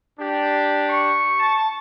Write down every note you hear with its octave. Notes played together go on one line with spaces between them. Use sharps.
D4 G4
C#6
A5